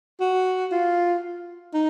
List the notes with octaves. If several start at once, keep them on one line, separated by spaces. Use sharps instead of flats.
F#4
F4
D#4